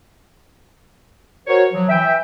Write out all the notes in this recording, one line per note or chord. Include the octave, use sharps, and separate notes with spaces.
F#4 A#4 C5 C#5
F3 F#3
E3 E5 G5